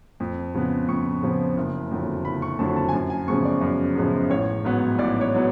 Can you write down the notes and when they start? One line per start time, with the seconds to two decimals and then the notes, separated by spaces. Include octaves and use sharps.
0.20 F2
0.55 C#3 F3 B3
0.88 F2 C#6
1.23 C#3 F3 B3
1.57 F#1
1.91 F2 D3 F#3
2.25 F#1 B5
2.42 C#6
2.59 F2 D3 F#3 A5
2.76 A5
2.89 G#5
2.93 F#2 A5
3.10 G#5
3.28 C#3 F3 G#3 B3 C#6
3.45 D5
3.61 F#2
3.96 C#3 F3 G#3 B3
4.30 A1 C#5
4.64 G#2 F#3 B3
4.99 A1 D5
5.21 C#5
5.35 F#3 B3